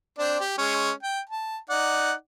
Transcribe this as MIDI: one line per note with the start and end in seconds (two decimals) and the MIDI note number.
0.19 0.40 60
0.19 0.40 62
0.19 0.40 74
0.40 0.54 67
0.58 0.91 56
0.58 0.91 61
1.03 1.20 79
1.29 1.57 81
1.70 2.13 63
1.70 2.13 74
1.70 2.13 78